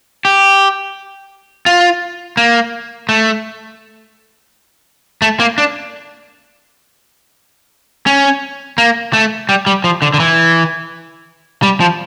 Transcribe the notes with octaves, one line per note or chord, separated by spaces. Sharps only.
G4
F4
A#3
A3
A3
A#3
D4
C#4
A#3
A3
G3
G3
F3
D3
D3
E3
G3
F3